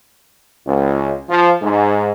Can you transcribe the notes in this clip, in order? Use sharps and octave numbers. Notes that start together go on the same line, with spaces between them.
C#2
F3
G#2